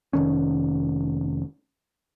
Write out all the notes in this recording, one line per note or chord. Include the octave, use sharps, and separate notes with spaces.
F1 D#3 C#4